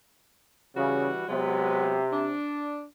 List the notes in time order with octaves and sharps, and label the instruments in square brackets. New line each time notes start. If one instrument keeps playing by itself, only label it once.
[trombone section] C#3 [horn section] E3 G3 F#4
[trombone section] C3 [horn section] F#3 G#3 B3
[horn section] D4